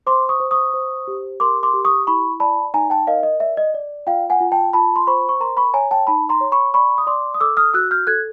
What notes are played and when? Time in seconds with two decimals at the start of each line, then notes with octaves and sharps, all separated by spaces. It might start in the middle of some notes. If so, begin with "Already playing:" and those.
0.07 C5 C6 D6
0.29 C#6 D#6
0.40 C5
0.51 C#6 D#6
0.74 C5
1.08 G4
1.40 A#4 C6 D6
1.63 C6 D6
1.74 G4
1.85 C#6 D#6
2.07 E4 B5 C#6
2.40 D5 A5 B5
2.74 D#4 G#5 A#5
2.90 G5 A5
3.07 A#4 D#5 F5
3.23 D#5
3.40 D5 E5
3.57 D#5
3.74 D5
4.07 F4 F5 G5
4.30 F#5 G#5
4.41 F4
4.52 G5 A5
4.73 F4 A5 B5
4.96 C6
5.07 C5 B5 C#6
5.29 C#6
5.40 A#4 A#5 C6
5.57 B5 C#6
5.74 C#5 G#5 A#5
5.91 G5 A5
6.07 D#4 A5 B5
6.29 A#5 C6
6.41 C#5
6.52 B5 C#6
6.74 D5 B5 C#6
6.98 D#6
7.07 D5 C6 D6
7.34 D#6
7.40 A4 D6 E6
7.57 D#6 F6
7.74 F#4 E6 F#6
7.91 F6 G6
8.07 A4 F#6 G#6